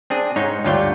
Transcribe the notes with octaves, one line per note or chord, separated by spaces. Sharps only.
C4 D4 G#4
G#2 D#4 C#5
D2 G2 F4 C#5 D5 G5